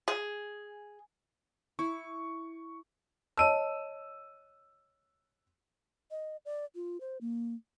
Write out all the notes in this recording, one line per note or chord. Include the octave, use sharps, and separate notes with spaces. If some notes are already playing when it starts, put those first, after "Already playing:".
G#4
E4 C#6
C#5 D#5 A5 E6 D#7
D#5
D5
F4
C5
A#3